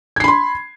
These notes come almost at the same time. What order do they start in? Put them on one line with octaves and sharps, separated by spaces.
G#6 C7 B5 C6